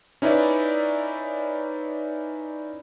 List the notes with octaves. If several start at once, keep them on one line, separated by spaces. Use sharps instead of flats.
C#4 D#4 E4 B4 D5 E5